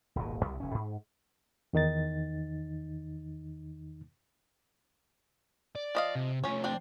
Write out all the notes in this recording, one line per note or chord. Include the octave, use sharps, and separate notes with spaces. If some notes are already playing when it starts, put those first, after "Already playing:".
D#1 G#1 D#2 B2
C2 C3 G3
F1 C#4
G#2
E2 D#3 D#4 A6
D5
F3 D#5 F5
C3
F3 A3 C#4 C#5
C4 D4 D5